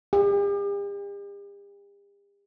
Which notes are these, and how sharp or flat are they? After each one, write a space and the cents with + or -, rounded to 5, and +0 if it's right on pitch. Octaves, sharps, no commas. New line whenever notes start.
G4 +45